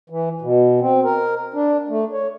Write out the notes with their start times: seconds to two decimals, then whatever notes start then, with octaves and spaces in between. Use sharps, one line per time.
0.10 E3
0.42 B2
0.81 C4
1.04 A#4
1.54 D4
1.89 A3
2.13 C#5